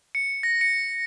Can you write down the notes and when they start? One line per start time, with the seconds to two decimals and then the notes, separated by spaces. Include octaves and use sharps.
0.15 C#7
0.43 A#6
0.61 C#7